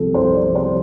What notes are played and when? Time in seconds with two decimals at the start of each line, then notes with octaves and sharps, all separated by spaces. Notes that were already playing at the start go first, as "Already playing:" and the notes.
Already playing: C2 C3 F3 A4
0.14 C2 C5
0.35 D5
0.45 C3 F3
0.55 C5